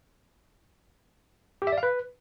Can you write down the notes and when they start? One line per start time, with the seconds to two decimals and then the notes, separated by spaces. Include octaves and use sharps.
1.62 G4
1.67 E5
1.72 D5
1.78 F5
1.83 B4